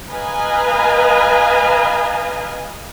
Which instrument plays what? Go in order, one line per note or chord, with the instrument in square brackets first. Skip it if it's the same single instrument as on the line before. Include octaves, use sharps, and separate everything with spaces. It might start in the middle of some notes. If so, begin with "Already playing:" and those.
[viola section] B4 D#5 F5 G#5 A#5